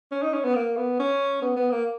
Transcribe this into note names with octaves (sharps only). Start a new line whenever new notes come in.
C#4
D#4
C#4
B3
A#3
B3
C#4
B3
B3
A#3